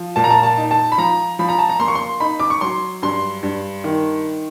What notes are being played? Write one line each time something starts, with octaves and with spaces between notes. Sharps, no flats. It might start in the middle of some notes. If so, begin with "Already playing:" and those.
Already playing: F3
A#2 A5
A#5
A5
A5
D#4
A5
B5
F3 A#5
F3 B5
A#5
A5
A#5
A#3 C6
C#6
C6
D#4 B5
D6
C#6
F#3 C6
G2 C6
G2
D#3